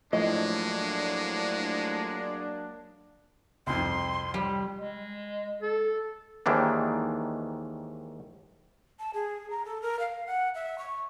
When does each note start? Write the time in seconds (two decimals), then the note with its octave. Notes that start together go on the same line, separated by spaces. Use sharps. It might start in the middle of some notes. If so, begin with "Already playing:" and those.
0.13 A2 F3 F#3 G#3 A#3 D4 D#5
3.67 C2 F2 C6
4.34 G3
4.77 G#3
5.62 A4
6.46 D#2 G#2 D#3 E3 D4
8.99 A5
9.13 G#4
9.50 A#5
9.65 A4
9.82 A#4
9.99 F5
10.27 F#5
10.55 E5
10.78 C#6